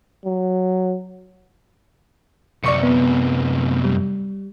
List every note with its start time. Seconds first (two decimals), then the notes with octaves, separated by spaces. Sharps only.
0.25 F#3
2.63 F#2 C3 D5 C#6 C#7
2.83 B3
3.84 G3